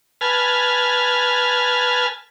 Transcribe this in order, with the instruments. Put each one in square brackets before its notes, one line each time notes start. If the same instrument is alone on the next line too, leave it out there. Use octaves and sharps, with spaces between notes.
[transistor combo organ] B4 G#5 A5 F6